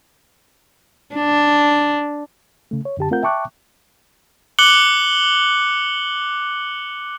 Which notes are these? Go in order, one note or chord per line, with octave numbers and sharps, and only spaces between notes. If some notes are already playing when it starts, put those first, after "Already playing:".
D4
C#3 A3
C#5
F#2 D3 G4 A5
A3 C4 F4 A#4 F#5 G6
E5 G5 A5 C#6 D6 F#6
D6 F#6 C#7 F#7 G7